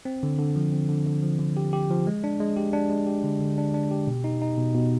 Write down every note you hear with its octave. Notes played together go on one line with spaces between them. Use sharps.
C4
D3
D3
F3
C4
D3
D3
F3
D3
G4
G4
F3
G#3
D4
G#3
G4
D4
G#3
G4
D3
D3
D4
D4
G4
B2
D#4
D#4
B2
B2